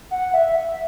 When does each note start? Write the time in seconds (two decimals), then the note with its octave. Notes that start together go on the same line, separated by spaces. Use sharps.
0.11 F#5
0.34 E5
0.55 E5